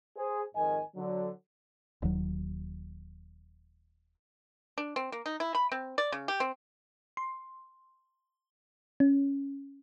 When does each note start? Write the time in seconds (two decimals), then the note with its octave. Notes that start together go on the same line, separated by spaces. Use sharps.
0.16 G#4 C5
0.55 F2 G#2 D#3 D#5 G#5
0.95 D3 F#3
2.02 D#1 D#2 F#3
4.78 D4
4.96 C4
5.12 A#3
5.26 D#4
5.40 E4
5.55 B5
5.72 C4
5.98 D5
6.12 C#3
6.28 G4
6.40 C4
7.17 C6
9.00 C#4